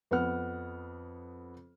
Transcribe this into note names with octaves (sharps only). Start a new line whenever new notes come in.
F2 B3 B4 F#5 F6